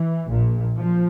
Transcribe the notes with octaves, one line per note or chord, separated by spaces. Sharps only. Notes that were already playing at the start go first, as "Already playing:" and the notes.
Already playing: E3
A#1 A#2
F3